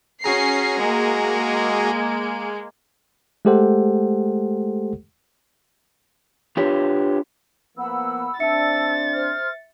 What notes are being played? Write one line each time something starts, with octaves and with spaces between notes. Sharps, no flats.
C#4 F#4 G#4 A#5 C7
G#3 A#3
G#3 A3 G4 A4 C5 F#5
D4 F4 G4 B4 C#5
F3 A#3 B3 F#5 B5 E6
C4 D4 E5 A5 E6 A6 C#7
C5 F6